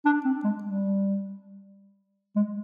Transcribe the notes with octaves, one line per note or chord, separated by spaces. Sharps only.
D4
C4
G#3
G3
G#3